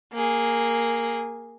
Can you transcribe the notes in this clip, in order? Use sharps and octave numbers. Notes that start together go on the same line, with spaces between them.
A#3 G#4